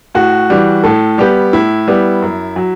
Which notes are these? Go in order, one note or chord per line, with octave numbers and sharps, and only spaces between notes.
A2 F#4
E3 G3
A2 A4
G3 B3 G4
A2 E4
G3 B3
F#2
F#3